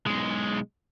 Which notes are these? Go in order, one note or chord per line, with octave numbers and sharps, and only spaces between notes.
B1 G#3